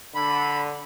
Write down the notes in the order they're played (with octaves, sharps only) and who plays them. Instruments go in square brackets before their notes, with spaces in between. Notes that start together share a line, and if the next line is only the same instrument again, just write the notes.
[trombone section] D3 [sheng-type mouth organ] B5